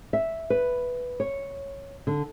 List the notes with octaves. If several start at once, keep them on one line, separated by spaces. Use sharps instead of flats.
E5
B4
C#5
D3